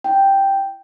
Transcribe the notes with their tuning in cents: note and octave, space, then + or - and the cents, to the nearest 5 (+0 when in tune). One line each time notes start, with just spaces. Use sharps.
E4 +10 G5 +0